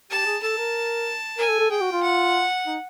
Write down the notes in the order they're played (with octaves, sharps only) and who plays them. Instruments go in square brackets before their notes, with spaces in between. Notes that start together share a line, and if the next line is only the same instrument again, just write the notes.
[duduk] G4 [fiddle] A5
[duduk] G#4
[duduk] A4 [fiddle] A5
[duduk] A#4
[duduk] A#4 [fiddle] G#5
[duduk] A4
A4
[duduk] G#4 [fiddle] G5
[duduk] F#4
F4
[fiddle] F#5
[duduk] D#4